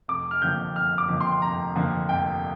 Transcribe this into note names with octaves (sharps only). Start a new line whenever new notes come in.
F1 D6
F6
F2 D3 A#3 G6
F1 F6
D6
F2 D3 A#3
C6
F1 A#5
F2 D3 A#3
F1 G5